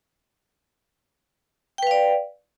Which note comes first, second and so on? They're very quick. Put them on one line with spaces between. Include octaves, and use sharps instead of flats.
G5 B4 F5 D5